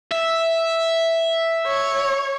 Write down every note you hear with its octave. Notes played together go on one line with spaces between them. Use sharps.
E5
C#5